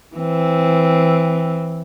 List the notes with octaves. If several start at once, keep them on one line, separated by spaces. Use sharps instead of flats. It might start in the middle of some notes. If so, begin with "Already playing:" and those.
E3 C4